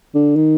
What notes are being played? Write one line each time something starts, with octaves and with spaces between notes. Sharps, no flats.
D3
D#3